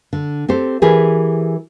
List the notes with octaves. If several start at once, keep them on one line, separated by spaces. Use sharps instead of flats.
D3
C4 G4 A4 C5
E3 G4 G#4 A#4 B4